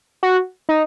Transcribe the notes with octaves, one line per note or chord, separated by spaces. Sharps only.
F#4
D#4